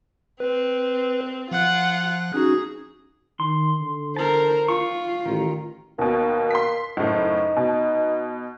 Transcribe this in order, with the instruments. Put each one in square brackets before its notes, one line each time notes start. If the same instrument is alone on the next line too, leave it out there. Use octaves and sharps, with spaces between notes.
[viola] C4 [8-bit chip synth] B4
[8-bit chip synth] F3 F#6 [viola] F4 F#5
[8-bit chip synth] C#4 D#4 F#4 [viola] G#4
[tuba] D#3 [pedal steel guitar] C6
[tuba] D3
[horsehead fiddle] A#4 C5 [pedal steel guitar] A5
[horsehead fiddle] F4 [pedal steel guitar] C#6
[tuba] A1 [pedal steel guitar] D#3
[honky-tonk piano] D#2 B2 [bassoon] A#3
[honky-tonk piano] C6 B6
[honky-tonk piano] F#1 A2 [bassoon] D#4
[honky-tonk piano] B2